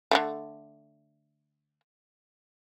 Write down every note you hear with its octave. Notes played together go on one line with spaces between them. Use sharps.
D3 D#3 A3